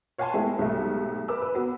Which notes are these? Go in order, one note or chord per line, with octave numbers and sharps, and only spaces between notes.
C#5 F5 F#5 G#5 A5 C6
G#3 A3 B3 E4 G4 A4
B1 G#2 C3 G3 A3
A#4 B4 G#5 B5 D6 E6
B4
B3 F#4